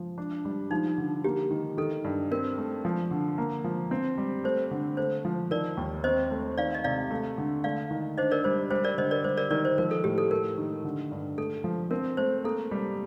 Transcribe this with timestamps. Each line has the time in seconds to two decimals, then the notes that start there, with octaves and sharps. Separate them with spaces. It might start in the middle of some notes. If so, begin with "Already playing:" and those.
Already playing: F3
0.18 D4
0.45 G3
0.71 F3 D#4
0.98 D3
1.24 A#3 G4
1.51 D#3
1.77 D#3 A4
2.04 G2
2.31 C4 A#4
2.58 A3
2.85 F3
3.11 D3
3.38 A#3
3.64 F3
3.91 C4
4.18 G3
4.44 A3 C5
4.71 D3
4.97 A3 C5
5.25 F3
5.51 D#3 A#4 D5
5.77 D#2
6.04 C4 C5 D#5
6.31 A3
6.58 D#3 D5 F5
6.75 D#5
6.84 C3 D5 F5
7.11 A3
7.38 D3
7.64 A3 D5 F5
7.91 D#3
8.18 D4 C5 D#5
8.31 A#4 D5
8.44 G3 C5
8.71 G3 C5
8.84 A#4 D5
8.98 D3 C5 D#5
9.11 A#4 D5
9.24 G3 C5
9.38 A#4 D5
9.51 D#3 A#4 D5
9.65 C5
9.78 F3 A#4
9.91 A4
10.04 A2 G4
10.18 A4
10.31 A3 A#4
10.58 D#3
10.85 D3
11.12 G2
11.38 A3 A4
11.64 F3
11.91 C4 A#4
12.17 A3 C5
12.44 A#3 A4
12.71 G3